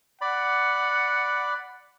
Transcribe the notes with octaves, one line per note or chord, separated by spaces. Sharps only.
D5 F#5 B5